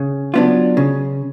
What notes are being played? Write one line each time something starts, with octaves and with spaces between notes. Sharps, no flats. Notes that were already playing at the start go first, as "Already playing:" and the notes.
Already playing: C#3
F#3 B3 D4 F4
C#3